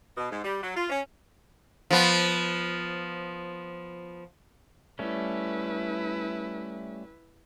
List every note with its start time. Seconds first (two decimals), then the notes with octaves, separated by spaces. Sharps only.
0.17 B2
0.31 G#2
0.44 G3
0.62 F#3
0.75 F4
0.90 C#4
1.91 F3 B3
4.99 G3 A3 C#4 E4 B4